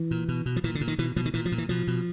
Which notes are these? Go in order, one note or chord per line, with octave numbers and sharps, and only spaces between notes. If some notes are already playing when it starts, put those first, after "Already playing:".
Already playing: E3
A#2
B2
B2
F3
A#2 E3
D3
A#2
D#3
B2 E3
B2 F3
D#3
A#2 E3
F3
A#2
E3
B2 F3
B2